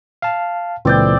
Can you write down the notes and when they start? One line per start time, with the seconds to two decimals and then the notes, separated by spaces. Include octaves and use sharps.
0.22 F5 A5
0.85 C#2 A#2 E3 C4 D5 G5